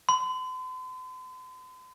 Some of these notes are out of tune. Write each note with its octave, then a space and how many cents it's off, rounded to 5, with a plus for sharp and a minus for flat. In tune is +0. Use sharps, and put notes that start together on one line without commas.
C6 -45